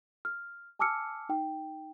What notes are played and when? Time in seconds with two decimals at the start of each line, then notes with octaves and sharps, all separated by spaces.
0.25 F6
0.79 G#5 A5 D6 E6 F6 C#7
1.29 D#4 G5